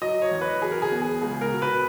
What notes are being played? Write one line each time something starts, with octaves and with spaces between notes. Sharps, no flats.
F#3 D#5
C#5
E2
B4
F#3 G#4
A#4
G#4
B3
G#4
C#2 G#4
A#4
B2
B4